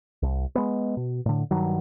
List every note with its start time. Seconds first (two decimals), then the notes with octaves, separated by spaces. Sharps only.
0.22 C2
0.55 G#3 B3
0.97 B2
1.26 A2 D3
1.51 G2 D#3 F#3